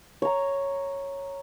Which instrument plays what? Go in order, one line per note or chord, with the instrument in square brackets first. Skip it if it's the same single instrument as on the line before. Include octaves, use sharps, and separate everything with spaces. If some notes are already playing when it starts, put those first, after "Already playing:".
[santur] C#5 A#5